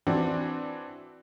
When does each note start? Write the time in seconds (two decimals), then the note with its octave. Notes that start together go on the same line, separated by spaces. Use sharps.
0.07 E3 C4 D4 F#4